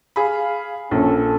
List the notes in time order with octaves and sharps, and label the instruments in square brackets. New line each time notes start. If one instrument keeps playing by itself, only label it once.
[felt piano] G#4 B5 [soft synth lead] F5
[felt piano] A#1 [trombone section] C#4 [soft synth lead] A4